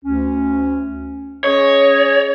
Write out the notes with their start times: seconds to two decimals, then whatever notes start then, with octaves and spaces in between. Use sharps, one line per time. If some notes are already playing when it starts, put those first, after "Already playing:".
0.04 D2 C#4
1.44 C#4 G#4 C#5 D#5